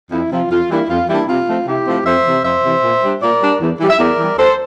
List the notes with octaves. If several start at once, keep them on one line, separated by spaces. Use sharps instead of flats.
F2 E4
C3 F3 F4
F2 F4
E3 G3 A#3 D4 E4
F2 F4
E3 G3 A#3 D4 E4
C3 F4
F3 A3 C4
C3 E4 G4
F3 A3 C4
F2 C5 E5
C3 E3
F2 C5 E5
C3 E3
A#2
G3 D4
A#2 A#4 D5
G3 D4
E2
E3 G3
E5
E2 A#4 D5
E3 G3
D2 A4 C5